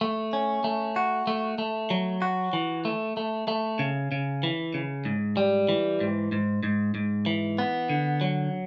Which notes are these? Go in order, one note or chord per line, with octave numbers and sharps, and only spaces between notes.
A3
C#4
A3
F#4
A3
A3
F#3
F#4
E3
A3
A3
A3
C#3
C#3
E3
C#3
G#2
G3
E3
G#2
G#2
G#2
G#2
E3
B3
D3
F#3